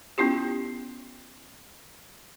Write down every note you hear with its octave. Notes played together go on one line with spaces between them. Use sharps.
B3 C#4 E4 F4 G4